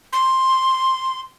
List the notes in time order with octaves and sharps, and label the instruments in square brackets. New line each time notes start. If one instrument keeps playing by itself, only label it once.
[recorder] C6